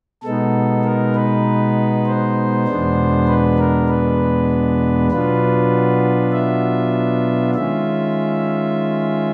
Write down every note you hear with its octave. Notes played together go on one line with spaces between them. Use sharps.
B2 G#3 B3 D#4 A4
A#4
B4
C5
E2 B2 G#3 B3 D4
B4
A#4
B4
B2 F#3 B3 D4 F4 B4
E5
D#3 G#3 C#4 F4 E5